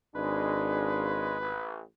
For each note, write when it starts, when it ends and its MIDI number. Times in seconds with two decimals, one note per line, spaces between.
0.15 1.58 32
0.15 1.36 49
0.15 1.36 56
0.15 1.33 62
0.15 1.79 71
1.41 1.80 33